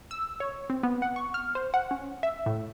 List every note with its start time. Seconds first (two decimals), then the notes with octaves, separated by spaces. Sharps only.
0.11 E6
0.40 C#5
0.70 C4
0.83 B3
1.02 F#5
1.16 C#6
1.34 F6
1.55 C5
1.74 F#5
1.91 C#4
2.23 E5
2.46 A2